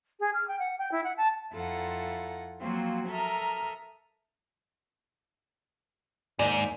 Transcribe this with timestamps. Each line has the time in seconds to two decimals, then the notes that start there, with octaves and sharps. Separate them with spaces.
0.20 G#4
0.34 F6
0.48 G5
0.59 F#5
0.78 G5
0.91 E4
1.04 F#5
1.17 A5
1.53 F2 E4 F4 A4 F#5 A#5
2.60 F3 F#3 A#3 C4 F4 F#4
3.09 A4 A#4 E5 A#5 D#6 F6
6.39 D#2 G#2 D5